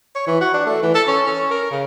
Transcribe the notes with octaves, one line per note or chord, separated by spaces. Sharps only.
C#5
E3
F#4
D4
A3
E3
A4
C#4
C#4
A#4
C#3